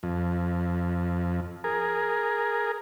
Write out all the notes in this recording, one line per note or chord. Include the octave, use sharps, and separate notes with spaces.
F2
G#4 A#4